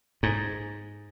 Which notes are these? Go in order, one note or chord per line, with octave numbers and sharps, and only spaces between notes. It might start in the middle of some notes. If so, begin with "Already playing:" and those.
G#2